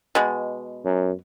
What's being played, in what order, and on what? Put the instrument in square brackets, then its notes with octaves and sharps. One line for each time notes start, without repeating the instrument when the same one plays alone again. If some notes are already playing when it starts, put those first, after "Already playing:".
[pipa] B2 G#3
[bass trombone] F#2